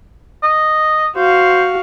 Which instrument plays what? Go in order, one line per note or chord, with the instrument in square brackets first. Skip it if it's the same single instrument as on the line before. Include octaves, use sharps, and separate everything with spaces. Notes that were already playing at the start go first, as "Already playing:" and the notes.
[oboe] D#5
[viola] F#4 F5 [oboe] C5